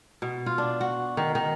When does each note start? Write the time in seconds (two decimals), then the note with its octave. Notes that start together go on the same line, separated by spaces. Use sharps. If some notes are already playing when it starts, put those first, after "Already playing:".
0.22 B2
0.46 F4
0.58 D4
0.81 F#4
1.17 D#3
1.35 D#3